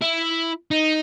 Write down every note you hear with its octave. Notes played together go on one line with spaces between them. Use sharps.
E4
D#4